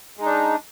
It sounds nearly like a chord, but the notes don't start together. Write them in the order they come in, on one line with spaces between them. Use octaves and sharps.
G#3 D#4 D4